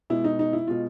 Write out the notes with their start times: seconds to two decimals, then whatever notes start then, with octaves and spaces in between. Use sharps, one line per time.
0.10 B2 G#3 E4
0.24 D#4
0.39 D#4
0.53 E4
0.67 B2 G#3 F4